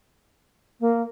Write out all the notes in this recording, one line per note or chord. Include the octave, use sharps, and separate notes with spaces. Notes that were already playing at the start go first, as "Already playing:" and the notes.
A#3